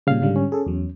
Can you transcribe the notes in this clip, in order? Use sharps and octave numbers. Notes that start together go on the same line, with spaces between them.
A#2 C#3 G3 F5
G#2 D3 G3
C#4
G#4 A4
E2 F#3